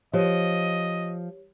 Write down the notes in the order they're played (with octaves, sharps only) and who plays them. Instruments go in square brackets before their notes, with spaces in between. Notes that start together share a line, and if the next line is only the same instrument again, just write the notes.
[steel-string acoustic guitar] F3 [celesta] G4 C#5 [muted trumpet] D#5